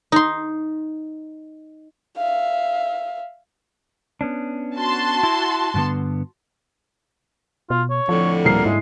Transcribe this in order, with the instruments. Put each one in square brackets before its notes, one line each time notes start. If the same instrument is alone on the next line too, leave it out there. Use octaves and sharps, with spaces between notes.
[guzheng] D#4 C6
[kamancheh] E5 F5
[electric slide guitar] B3 C#4 D4
[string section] F#4 A5 C6
[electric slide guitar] E4
G2 D3 B3
[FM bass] B2 [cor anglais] F4
[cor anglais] C#5
[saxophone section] F2 A2 D3 [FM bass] F3
[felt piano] D#1 C7 [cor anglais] A#4
[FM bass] G#2 [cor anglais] G#3 [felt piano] E4